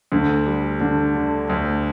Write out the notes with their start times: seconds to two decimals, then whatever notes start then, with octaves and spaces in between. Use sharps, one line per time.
0.12 D2 D3
0.46 G3
0.80 D3 D4
1.15 D3
1.49 D2